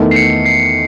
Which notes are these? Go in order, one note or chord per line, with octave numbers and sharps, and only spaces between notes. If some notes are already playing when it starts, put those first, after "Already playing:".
Already playing: E2 D#3 A3
C7
C#7
C7